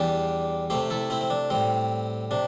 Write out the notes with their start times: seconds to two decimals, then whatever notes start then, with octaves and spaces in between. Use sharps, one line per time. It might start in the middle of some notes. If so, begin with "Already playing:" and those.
Already playing: E2 E3 G3 D4 G4
0.70 C3 A3 G4 C5
0.90 E4 A4
1.10 C4 E4
1.21 C4
1.30 D4
1.50 A2 G3 C4
2.31 C3 D4